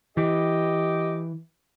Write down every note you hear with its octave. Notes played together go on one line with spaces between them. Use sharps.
E3 G4 D#5